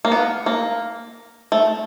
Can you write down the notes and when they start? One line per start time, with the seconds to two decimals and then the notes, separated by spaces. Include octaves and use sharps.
0.05 A#3
0.12 B3
0.46 A#3
1.52 A3